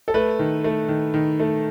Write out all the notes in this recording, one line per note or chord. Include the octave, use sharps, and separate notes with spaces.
A4
A3 B4
D#3
A3
D#3
D#3
A3